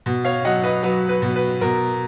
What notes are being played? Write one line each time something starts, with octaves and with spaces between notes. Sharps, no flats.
B2
C#5 F5
F#3 D#5 F#5
B4 D#5
F#3 B4
B4
B2
B4
B2 A#4